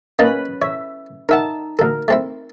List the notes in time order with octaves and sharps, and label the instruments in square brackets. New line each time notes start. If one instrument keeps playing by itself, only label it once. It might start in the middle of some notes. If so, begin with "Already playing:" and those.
[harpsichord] A#3 D#4 A5 [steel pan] C#4 B4 B5
[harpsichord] C#5 [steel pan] E5
[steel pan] D#4 A5 [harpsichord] A#4 E5 F#5
[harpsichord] D2 A4 [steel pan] A#4
[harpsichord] A3 C4 E4